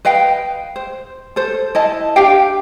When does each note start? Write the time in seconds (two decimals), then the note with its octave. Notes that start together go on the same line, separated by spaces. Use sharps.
0.05 B4 D#5 F5 G5
0.76 C5
1.36 A4 C5
1.75 E4 D#5 A5
2.16 D4 G4 F5 G5